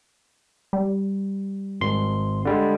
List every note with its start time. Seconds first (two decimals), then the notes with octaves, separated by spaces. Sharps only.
0.73 G3
1.81 G#1 C6
2.45 D3 G3 G#3